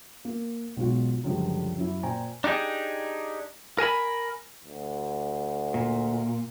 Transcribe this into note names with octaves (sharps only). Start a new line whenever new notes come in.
A#3
B1 G#2 B2 F4 F#4
C#2 F#2 D3 F3 G3
F#2 F#3 E4
A#2 C5 G5 G#5 A#5
D4 D#4 G4 G#4
A#4 G#5 A5 B5
D2
A#2